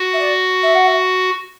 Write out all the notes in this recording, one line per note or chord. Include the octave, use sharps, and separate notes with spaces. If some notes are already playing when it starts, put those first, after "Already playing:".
Already playing: F#4
E5
D5
E5
F#5
E5